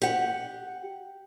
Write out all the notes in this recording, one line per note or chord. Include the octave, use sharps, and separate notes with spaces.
G4 F#5